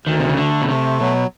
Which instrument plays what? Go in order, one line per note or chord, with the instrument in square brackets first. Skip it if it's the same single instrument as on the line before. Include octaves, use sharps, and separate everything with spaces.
[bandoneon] D2 [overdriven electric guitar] D#3
[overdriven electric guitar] C3
C#3
[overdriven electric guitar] D3 [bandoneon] A3
[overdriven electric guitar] B2
[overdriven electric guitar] C3 [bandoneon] A3
[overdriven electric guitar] B2 [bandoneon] F#3